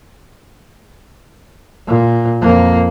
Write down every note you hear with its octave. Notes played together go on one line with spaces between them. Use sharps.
A#2
F2 A#3